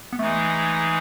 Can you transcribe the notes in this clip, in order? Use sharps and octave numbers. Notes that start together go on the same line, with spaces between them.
B3
E3 G#3 A3 D#4 G#4